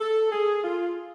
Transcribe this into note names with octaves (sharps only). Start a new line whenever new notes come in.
A4
G#4
F4